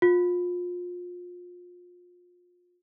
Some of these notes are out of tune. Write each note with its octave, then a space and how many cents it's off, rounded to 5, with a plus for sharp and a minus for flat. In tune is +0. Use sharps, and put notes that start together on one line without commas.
F4 +30